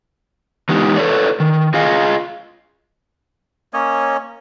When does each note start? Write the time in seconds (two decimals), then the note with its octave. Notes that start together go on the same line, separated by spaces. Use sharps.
0.69 E3 G#3 B3 D#4 G4
0.96 A4 B4 C#5 D5
1.40 D#3
1.74 F4 G#4 D#5 F5
3.73 A#3 C#4 C#5 D#5